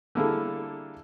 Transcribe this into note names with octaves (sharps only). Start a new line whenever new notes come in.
D3 G3 A#3 E4 G#4 A4